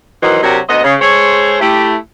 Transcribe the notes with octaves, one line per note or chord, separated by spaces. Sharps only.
D#3 E3 F#3 D#4 F#4 C5
C3 F#3 D4 F#4 G4 A#4
D2 B3 C5 D#5
C#3
G#3 G#4 A4 C5 C#5
A3 E4 G4